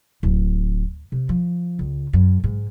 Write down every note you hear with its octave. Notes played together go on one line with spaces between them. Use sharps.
D1
C3
F3
C#2
F#2
G#2